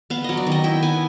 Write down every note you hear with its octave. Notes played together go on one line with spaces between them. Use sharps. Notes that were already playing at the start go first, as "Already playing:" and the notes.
B3 F5
F#3 D#5
D5
D#3
D#5
E4 G5
B3 G#5